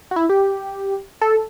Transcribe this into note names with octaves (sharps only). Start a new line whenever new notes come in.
F#4
E4
G4
A4